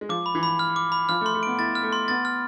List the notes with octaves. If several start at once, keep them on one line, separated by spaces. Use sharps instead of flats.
G#3
F3 D6
B5
E3
B5
F6
D6
B5
F3 F6
A3
C6
A3
B3 D7
E4 A6
F6
A3
C6
B3 A6
F6